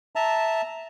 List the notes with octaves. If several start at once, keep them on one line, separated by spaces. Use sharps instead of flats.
E5 A5 A#5